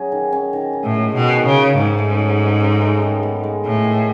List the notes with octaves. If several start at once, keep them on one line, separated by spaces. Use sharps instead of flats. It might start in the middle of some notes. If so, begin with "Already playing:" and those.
Already playing: F#3 C#4 G#4
D#3
C#4
D#3
D#4
A2
G#3
B2 D#3
D#3
C#3
D#4
G#2 C#3
A3
F#3
D#4
C#3
A3
D#3
B3
G#3
A2 D#4
D#3